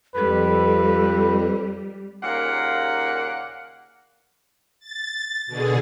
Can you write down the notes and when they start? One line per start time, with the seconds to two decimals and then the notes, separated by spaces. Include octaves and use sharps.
0.15 F2 G3 A4 B4
2.23 D#2 A#2 C#3 A#3 F#5
4.80 A6
5.47 B2 D3 G#4